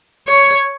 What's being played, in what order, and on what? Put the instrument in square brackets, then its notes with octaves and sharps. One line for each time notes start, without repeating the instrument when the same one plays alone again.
[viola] C#5